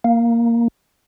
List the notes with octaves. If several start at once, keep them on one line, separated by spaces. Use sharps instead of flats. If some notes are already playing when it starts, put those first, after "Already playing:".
A#3